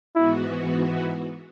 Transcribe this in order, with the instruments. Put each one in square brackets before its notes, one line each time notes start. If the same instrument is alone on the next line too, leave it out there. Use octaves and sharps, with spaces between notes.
[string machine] G#2 E3 B3 F#4 [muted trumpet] E4